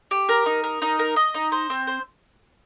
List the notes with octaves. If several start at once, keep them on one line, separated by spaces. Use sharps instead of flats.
G4
A#4
D#4
A#4
D#4
A#4
D#5
D#4
C5
C4
C5